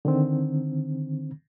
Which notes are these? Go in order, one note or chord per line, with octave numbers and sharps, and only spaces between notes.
D3 D#3 C4